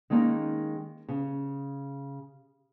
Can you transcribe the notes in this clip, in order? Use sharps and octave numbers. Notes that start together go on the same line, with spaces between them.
D#3 G#3 A#3 C#4 D#4
C#3